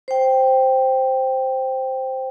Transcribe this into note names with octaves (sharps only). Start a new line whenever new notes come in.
C5 G5